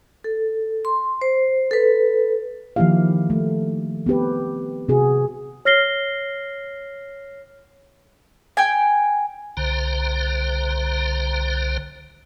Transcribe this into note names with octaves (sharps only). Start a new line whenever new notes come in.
A4
C6
C5
A4 B4
D#3 F3 A#3 E4 G4 F5
A3
B3 C4 G4 B4
C3 F#4 G#4
C#5 F6 A#6 C7 G7
G5 G#5
C2 D3 C5 A#5